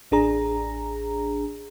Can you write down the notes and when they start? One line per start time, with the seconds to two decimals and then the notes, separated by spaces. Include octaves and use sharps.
0.11 A1 D4 G#4 A#5